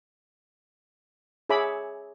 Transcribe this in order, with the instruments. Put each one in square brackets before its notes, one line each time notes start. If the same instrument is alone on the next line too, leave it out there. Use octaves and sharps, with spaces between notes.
[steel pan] G#4 C#5 E5 B5 D6